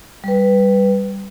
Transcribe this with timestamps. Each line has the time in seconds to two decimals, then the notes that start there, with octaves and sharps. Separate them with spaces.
0.24 G3 B4